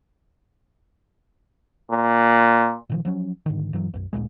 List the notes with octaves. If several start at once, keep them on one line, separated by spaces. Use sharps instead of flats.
A#2
A#2 D#3 F3
F3 F#3 C#4
G#2 D3 D#3
G2 E3 F#3
B1 F#2
A1 D2 A#2 G#3